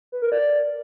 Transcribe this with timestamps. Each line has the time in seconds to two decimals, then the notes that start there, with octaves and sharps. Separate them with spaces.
0.12 B4
0.22 A#4
0.32 D5